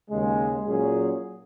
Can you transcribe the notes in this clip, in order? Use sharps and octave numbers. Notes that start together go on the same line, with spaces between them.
D#2 C#3 G#3
A#2 F#3 C#4 G#4